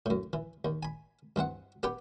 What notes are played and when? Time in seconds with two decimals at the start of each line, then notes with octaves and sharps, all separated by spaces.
0.06 F#2 A2
0.33 E3
0.65 D#2
0.83 G#5 B5
1.36 G2 E3 C4 F#5
1.83 B3 G4 B4 G5